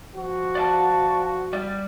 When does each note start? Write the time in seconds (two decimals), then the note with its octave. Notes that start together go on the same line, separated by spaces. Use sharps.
0.14 F3 F#4
0.55 D5 F5 A5
1.53 G3 D5